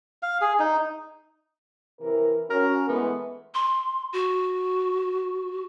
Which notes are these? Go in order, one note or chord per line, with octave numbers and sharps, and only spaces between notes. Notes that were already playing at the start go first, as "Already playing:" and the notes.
F5
G#4
D#4
C3 E3 A#4
C#4 F#4 A#4
E3 G#3 A3 B3
C6
F#4